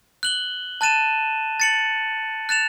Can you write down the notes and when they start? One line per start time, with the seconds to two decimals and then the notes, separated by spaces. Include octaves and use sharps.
0.23 F#6 F#7 G7
0.81 A5 F#6 A6 D#7 E7
1.60 A6 C#7 F#7
2.49 F#6 A6 E7 F7